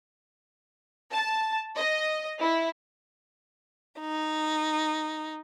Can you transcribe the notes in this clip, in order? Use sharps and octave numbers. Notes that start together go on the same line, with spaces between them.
A5
D#5
E4
D#4